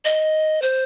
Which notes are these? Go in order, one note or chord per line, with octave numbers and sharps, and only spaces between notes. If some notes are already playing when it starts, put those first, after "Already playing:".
D#5
C5